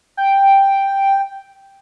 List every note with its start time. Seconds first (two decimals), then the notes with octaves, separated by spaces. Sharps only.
0.17 G5